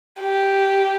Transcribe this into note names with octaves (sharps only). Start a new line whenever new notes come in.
G4